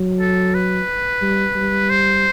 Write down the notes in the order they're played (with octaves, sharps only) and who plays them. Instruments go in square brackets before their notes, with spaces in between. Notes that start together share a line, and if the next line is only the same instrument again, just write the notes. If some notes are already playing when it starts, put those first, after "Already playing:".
Already playing: [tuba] F#3
[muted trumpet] A4
B4
[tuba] G3
G3
[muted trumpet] C5